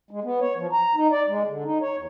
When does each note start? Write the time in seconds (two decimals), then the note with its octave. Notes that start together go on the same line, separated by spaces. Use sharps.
0.11 G#3
0.24 B3
0.40 C#5
0.57 F3
0.73 A#5
0.95 D#4
1.12 D5
1.28 G#3
1.47 D3
1.64 D#4
1.81 C#5
1.96 E2